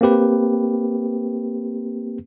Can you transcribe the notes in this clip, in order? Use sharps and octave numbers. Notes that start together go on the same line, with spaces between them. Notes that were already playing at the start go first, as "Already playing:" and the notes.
A#3 C4 G4 B4